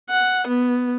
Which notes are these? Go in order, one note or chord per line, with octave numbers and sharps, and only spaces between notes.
F#5
B3